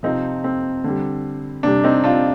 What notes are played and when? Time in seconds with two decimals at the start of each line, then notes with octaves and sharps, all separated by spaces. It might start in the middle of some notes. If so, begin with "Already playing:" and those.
0.03 C3 F3 C4 D#4
0.44 C4
0.84 D3 G3
1.63 C3 G3 D4
1.84 C4 D#4
2.04 D4 F4